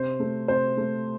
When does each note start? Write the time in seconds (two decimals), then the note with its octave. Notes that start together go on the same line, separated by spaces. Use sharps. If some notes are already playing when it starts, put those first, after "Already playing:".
Already playing: C3 C5
0.20 A3
0.48 C3 C5
0.77 A3